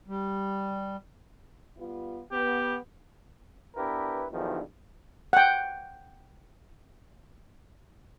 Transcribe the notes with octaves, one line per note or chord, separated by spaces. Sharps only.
G3
G3 B3 F4
B3 G4
B3 D4 E4 G4 A#4 B4
B1 E2 G2 D3 D#3 F3
F#5 G5